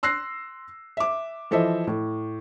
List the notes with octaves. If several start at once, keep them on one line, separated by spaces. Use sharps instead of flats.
C6 E6 F#6 A#6 C7
E5 D6
E3 F3 A4 C5 D#5 E5
A2